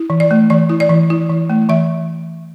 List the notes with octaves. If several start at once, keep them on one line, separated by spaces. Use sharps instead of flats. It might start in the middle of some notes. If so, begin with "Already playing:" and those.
Already playing: E4
E3
D5
A3
E3 D5
E4
D5
E3
E4
E3
A3
E3 E5